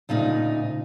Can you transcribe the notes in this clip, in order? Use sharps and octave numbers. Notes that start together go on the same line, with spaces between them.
D2 A#2 C#3 D#4